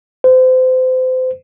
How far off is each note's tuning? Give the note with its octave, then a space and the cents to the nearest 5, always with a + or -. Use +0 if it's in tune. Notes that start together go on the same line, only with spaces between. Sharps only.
C5 -30